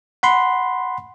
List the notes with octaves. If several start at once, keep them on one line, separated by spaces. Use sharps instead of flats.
F#5 B5 C6